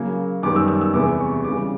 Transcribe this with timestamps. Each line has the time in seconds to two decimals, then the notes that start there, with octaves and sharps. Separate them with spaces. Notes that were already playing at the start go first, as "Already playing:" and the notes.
Already playing: C#3 F#3 A#3
0.43 F#2 D#3 G3 B3 D6
0.56 E6
0.68 E6
0.81 E6
0.94 E2 C3 E3 G#3 B3 D6
1.19 C#6
1.44 C#3 E3 G3 D6